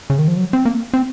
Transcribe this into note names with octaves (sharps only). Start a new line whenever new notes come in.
C#3
D#3
F3
F#3
C4
A#3
C4